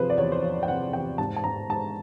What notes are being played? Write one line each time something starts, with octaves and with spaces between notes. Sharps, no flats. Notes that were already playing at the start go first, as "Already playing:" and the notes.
Already playing: C3 F3 G#4 B4 C5
D5
E2 C#5
C5
F3 C#5
G5
C3 F#5
E2 G5
G#2 A5
A5
G#2 A#5
G#2 A5